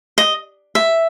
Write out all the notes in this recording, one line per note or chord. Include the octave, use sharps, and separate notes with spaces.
D#5
E5